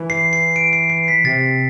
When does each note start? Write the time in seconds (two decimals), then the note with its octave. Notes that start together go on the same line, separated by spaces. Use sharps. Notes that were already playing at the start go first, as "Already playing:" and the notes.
Already playing: E3
0.10 C7
0.33 C7
0.56 D7
0.73 C7
0.90 C7
1.08 B6
1.24 C3 A6